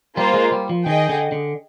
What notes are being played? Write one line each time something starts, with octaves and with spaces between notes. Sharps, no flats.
G3 A#3 F4 C5
G#3
G3
F3
D#3 G#4 D#5 G5
D3
D3